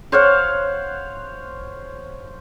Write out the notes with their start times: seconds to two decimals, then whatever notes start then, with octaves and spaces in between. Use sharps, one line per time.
0.12 C5 C#5 F5 F#5